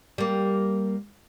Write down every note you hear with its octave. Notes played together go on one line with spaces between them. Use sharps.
G3 A#3